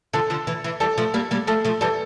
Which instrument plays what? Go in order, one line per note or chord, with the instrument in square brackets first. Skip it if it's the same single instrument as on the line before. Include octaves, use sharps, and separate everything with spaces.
[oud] D3 F3 [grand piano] A4
[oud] D3 F3
E3
E3
[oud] E3 G3 [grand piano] A4
[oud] F3 A3
G3 A#3
G3 A#3
[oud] F3 A3 [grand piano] A4
[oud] F3 A3
[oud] E3 G3 [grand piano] A4